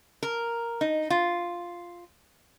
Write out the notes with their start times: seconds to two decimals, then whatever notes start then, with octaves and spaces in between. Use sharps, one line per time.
0.23 A#4
0.81 D#4
1.10 F4